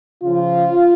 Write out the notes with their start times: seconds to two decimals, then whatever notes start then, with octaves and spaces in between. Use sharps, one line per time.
0.23 C#3 F3 F4